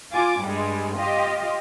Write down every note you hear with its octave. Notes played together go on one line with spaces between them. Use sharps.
F4 G#5 D6
G2 G3 G#3
F4 G4 D#5